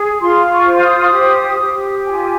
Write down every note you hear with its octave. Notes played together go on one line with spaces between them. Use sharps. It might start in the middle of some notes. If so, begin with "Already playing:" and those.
Already playing: G#4
F4 C6
C#6
C5
D#6
G4
G4
F4 G#5